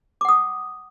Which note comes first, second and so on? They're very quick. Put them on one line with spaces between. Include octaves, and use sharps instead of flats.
D6 F#5 D#6